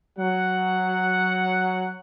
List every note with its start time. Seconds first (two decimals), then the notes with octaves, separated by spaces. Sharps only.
0.19 F#3 F#5